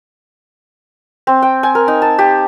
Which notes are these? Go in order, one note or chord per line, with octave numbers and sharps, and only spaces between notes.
C4
G5
G#5
A#4
D#4
A5
G4